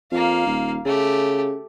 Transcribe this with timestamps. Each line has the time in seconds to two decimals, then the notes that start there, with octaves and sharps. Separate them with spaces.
0.11 F2 A#3 F5
0.47 D#1
0.85 C#3 A3 G4